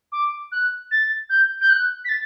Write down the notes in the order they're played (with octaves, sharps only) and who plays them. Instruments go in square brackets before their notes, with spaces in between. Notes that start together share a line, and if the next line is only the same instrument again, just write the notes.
[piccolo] D6
F#6
A6
G6
G6
F#6
B6
A6